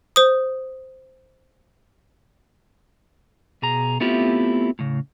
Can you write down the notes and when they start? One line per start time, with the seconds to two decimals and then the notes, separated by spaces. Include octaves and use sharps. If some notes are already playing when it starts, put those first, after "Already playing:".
0.16 C5 D#6
3.62 B2 G#4 A#5
4.00 A3 B3 C4 E4 F4 G4
4.79 A2 C#3